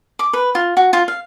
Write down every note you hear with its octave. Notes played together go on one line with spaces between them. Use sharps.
D6
B4
F4
F#4
F4
F5